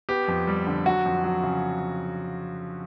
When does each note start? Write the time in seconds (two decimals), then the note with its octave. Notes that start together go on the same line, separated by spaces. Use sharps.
0.09 B3 G4
0.28 F2
0.47 G3
0.67 D3
0.86 F#3 F#4
1.05 F2
1.24 F#3
1.43 C#3